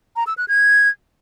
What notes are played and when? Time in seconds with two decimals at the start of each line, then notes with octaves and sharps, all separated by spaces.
0.16 A#5
0.27 E6
0.38 F#6
0.48 G#6